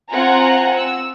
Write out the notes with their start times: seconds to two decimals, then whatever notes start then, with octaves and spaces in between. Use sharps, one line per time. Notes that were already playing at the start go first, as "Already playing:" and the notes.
0.11 C4 F4 F#5 G#5 A#5
0.77 E6